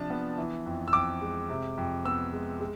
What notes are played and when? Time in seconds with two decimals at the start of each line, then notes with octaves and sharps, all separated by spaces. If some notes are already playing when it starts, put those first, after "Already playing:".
Already playing: C3 F3 D4 A5
0.10 B3
0.38 E3
0.66 F2
0.88 E6
0.93 F2 D6
1.22 G#3
1.49 C3
1.78 F2
2.05 B3 E6
2.33 G#3
2.60 G#3